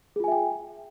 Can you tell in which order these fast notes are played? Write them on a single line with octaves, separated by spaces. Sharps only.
G#4 F4 G#5 E5 G5